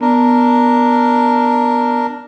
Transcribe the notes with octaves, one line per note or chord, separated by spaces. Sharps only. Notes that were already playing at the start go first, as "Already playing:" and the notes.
B3 D4 A#4